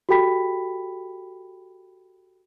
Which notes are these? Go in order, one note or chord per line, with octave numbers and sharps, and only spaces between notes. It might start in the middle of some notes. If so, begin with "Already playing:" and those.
F#4 G4 A4 G5 B5 B6